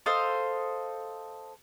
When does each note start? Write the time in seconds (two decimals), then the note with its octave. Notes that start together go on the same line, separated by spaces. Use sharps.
0.06 A4 C5 D#5 F5